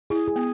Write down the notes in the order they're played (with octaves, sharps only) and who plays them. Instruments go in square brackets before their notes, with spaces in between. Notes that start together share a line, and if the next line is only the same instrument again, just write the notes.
[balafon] E4 [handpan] G#4
[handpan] G#4
[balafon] B3